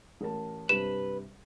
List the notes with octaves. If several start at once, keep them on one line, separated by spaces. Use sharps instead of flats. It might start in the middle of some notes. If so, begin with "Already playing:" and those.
A1 A#4 A5
G2 C3 B4 E7